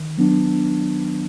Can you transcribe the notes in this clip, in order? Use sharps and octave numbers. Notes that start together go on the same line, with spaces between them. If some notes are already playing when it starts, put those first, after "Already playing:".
Already playing: D#3
F#3 B3 D4